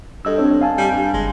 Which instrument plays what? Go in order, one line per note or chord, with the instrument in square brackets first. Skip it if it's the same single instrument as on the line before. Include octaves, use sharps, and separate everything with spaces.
[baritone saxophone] G2 [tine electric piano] A4 D#5 E6
[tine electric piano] C4 D4 C#5
F5 G#5 A5
[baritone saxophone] G3
G2
[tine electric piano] G1 [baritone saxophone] G#3